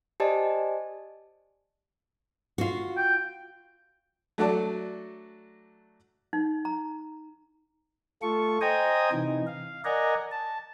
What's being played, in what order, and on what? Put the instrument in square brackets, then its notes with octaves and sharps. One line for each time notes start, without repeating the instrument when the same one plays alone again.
[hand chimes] G4 C5 D5 D#5 G#5 A5
[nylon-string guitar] F4 F#4
[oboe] G5
[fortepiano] F#3 A3 D4 F#4 A4 D5
[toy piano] D#4
A#5
[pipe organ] A3 F4 A4 C#6
C5 D#5 G5 G#5 A#5 D#6
C3 E3 D#4
F5
A#4 D5 D#5 F#5 G#5 A#5
A5